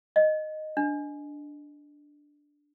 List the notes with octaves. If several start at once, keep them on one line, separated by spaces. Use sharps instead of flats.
D#5
D4